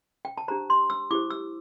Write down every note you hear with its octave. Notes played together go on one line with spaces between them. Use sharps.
G5
A5
D4 G4 C5 A#5
C6
E6
E4 G4 C5 D6
E6